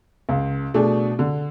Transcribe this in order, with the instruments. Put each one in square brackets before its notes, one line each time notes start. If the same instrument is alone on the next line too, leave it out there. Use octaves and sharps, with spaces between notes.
[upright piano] C#2
B2 A3 D4 G#4
D3